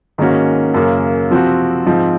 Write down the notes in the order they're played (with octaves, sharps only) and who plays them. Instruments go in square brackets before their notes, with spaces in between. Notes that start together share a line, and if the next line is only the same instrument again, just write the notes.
[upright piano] G#2 D#3 A#3 C#4 F#4
F#2 C#3 F#3 A#3 C#4
C3 F3 C4 F#4
G#2 F3 C4